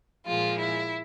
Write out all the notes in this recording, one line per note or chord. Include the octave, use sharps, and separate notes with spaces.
A#2 F3 G#3 F4
E4